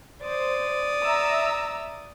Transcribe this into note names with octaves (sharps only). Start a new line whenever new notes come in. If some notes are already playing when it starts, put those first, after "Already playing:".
C5 D5 D#6
E5 A#5 E6